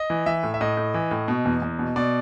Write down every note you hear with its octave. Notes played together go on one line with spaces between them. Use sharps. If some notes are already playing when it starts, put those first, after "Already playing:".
Already playing: D#5
E3
E3 E5
A2
E5
A2 D#5
A2
E3
A2
B2
E2
E2
B2
B2 D5